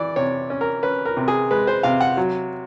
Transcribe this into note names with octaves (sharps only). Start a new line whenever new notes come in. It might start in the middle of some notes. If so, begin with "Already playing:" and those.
Already playing: E3 D5
C3 C#5
C#4
A#4
C#4 B4
A#4
C3
G#4
G#3 B4
C5
C3 F5
F#5
F#3